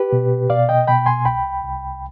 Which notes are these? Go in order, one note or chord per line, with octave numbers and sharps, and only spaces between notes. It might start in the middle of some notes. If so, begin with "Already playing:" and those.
Already playing: G4 B4
B2
B2 D5 F5
D#5 G5
B2 G5 B5
G#5 C6
C2 G5 B5
C2